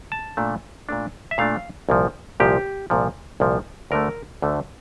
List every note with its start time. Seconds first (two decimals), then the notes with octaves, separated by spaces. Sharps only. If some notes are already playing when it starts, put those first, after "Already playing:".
0.12 A5
0.37 A#2 A3 D4
0.89 A#2 A3 D4
1.31 E5
1.38 A#2 A3 D4 F5
1.89 C2 A#2 F3
2.40 C2 A#2 F3 G4
2.90 C2 A#2 F3
3.40 C2 A#2 F3
3.91 D2 D3 A3 A#4
4.42 D2 D3 A3